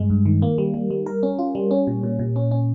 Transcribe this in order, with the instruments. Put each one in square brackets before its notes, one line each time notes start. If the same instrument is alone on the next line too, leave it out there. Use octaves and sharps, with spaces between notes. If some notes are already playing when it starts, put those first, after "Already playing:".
Already playing: [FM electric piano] G2 G#3
G2
D#3
A#3
G3
G3
G3
A#4
C#4
F4
G3
C#4
A#2
A#2
A#2
C#4
C#4